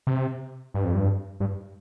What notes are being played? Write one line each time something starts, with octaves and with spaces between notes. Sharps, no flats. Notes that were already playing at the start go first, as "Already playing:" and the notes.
C3
G2
F2
G2
G2